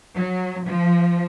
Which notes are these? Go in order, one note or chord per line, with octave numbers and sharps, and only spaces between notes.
F#3
F3